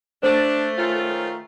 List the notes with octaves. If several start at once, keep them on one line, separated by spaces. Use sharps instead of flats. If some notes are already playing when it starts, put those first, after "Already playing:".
A3 D4 C5
D#3 C#4 F4